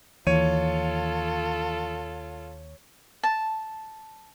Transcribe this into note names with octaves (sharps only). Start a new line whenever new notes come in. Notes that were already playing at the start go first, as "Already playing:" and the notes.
D#2 E3 F4 A4 C#5 D#7
A5